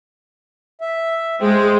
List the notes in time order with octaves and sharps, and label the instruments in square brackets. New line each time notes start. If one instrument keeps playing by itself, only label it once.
[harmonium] E5
[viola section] G#3 [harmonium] C5 G5